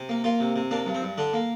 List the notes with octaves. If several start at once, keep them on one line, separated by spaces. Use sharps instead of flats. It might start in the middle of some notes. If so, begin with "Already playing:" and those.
Already playing: C3
A#3
A#3 F4
C3
C3
A#3 D4
G2
C4
G2
D3 D4
A#3